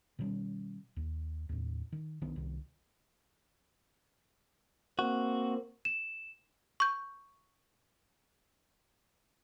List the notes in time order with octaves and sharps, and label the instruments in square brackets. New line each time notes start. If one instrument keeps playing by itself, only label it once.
[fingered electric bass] B2 D#3 G3 C#4
D#2
D#2 A2
D#3
B1 D#3 B3 D4
C2 C3 D#3
[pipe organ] A#3 C4 [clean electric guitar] F#4
[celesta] E7
[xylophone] C#6 G6